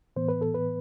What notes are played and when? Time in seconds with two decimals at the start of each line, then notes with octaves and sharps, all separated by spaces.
0.16 A2 E3 B3 C5
0.29 B4
0.41 A4
0.55 B4